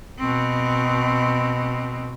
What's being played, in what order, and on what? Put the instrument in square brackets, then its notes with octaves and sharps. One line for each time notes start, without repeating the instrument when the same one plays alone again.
[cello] B2 C4